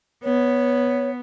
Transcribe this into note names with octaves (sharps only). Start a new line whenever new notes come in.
B3 C#5